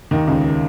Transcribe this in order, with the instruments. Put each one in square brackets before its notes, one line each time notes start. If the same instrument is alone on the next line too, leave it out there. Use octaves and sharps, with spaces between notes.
[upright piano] D#2 D#3
C#2 C#3